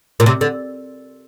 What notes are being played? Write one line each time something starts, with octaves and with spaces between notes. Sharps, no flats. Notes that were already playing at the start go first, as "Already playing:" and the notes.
A#2
C3
D3